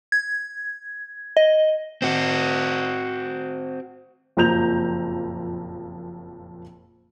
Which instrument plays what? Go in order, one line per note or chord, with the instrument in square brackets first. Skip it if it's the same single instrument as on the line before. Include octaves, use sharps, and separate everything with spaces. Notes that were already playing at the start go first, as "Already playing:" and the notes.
[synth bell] G#6
D#5
[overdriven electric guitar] C4 F#4
[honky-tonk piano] F#1 F2 A#2 A#5 G6 F7